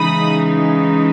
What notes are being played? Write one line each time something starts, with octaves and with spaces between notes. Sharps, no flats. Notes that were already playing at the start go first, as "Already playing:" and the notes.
Already playing: C#3 E3 G#3 D#4 B5 D#6